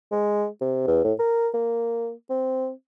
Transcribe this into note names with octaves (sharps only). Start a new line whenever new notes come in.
G#3
C3
E2
A2
A#4
A#3
C4